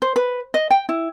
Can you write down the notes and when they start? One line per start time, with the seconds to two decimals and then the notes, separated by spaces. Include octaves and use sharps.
0.02 C5
0.16 B4
0.54 D#5
0.71 G5
0.89 E4